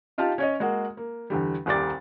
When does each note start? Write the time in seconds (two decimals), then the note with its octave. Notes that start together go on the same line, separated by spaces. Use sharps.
0.18 D#4 F4 G4 F5 A5
0.38 C#4 C#5 D#5
0.60 G#3 A#3 F#4
0.97 A#3
1.30 E2 D3 G3
1.66 D#1 C2 G3 D5 D6 A6